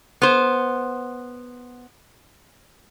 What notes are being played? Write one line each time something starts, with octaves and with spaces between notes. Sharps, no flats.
B3 C5